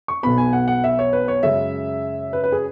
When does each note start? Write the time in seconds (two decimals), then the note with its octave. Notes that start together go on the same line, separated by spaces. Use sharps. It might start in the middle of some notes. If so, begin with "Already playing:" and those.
0.08 C#6
0.23 B1 B2 B3 B5
0.38 G#5
0.53 F#5
0.68 F#5
0.84 E5
0.99 C#5
1.13 B4
1.28 C#5
1.43 F#2 C#3 G#3 E5
2.33 B4
2.44 B4
2.52 G#4